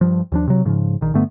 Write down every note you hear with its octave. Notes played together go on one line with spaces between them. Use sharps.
G2 F3
D#2 F3 D4
C3 F#3
G#2 C#3 F3
A#1 D#3
G2 D3 A3 B3